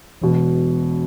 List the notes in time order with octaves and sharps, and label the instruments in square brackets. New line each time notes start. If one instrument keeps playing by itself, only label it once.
[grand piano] E1 E2 B2